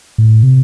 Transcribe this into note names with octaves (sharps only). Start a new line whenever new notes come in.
A2
C3